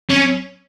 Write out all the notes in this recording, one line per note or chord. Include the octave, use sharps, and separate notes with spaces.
C#4